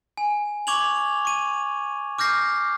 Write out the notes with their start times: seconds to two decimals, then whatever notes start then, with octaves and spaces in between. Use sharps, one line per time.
0.17 G#5
0.67 C#6 D6 G#6 F7 F#7
1.25 C#6 D#7
2.18 D6 F6 G6 A#6 C7